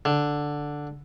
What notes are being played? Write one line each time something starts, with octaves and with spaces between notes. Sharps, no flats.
D3